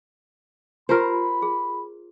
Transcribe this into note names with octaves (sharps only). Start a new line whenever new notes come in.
F4 G4 A#4 C5 B5
G#4